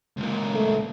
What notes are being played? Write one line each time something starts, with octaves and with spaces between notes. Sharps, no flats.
C#2 A#2
A3